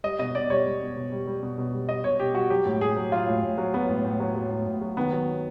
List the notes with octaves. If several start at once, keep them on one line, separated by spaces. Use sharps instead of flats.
G3 D#5
B2 D#5
B2 D5
G3 C#5
G3
B2
B2
G3
G3
B2
B2
G3
G3 D#5
B2 C#5
B2 G4
G3 F#4
F#3 G4
A2
A2 G#4
F#3
F#3 F4
A2
A2
F#3
F#3 B3
A2
A2
F#3
F#3
A2
A2
F#3
D#3 B3
F#3